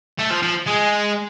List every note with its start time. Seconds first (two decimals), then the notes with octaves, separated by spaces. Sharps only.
0.18 A3
0.30 F3
0.43 F3
0.67 G#3